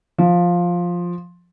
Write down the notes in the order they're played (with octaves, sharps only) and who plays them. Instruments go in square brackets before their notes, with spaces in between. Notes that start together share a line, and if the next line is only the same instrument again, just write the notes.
[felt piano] F3